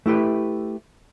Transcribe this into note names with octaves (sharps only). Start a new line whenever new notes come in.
A3 E4 G4 B4